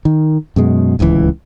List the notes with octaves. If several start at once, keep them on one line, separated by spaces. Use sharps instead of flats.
D#3
F#2 B2 G#3
D1 C#2 D#3 E3